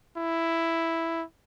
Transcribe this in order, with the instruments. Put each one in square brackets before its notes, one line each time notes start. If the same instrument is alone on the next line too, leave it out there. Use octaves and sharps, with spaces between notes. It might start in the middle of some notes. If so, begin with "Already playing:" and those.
[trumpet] E4